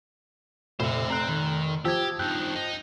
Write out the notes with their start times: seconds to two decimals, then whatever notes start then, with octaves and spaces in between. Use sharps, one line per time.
0.80 F1 A#2 C5 E5
1.10 C4 A#5 F#6
1.29 D#3
1.85 F3 G4 E6 G#6
2.19 G2 D#3 G5 F#6 G6
2.55 D#4